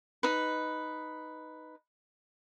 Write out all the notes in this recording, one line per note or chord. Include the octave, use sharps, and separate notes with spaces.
D#4 B4